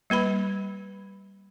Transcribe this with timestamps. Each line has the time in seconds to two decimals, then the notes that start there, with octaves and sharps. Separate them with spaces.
0.10 G3 A#3 B4 B5